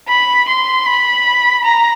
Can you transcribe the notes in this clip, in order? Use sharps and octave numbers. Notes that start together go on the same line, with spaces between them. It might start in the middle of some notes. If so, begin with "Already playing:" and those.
B5
C6
B5
A#5